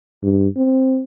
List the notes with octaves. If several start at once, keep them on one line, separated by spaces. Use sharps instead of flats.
G2
C4